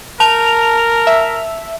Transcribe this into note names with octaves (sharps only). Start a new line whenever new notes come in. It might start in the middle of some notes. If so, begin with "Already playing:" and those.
A#4 A5 F7
E5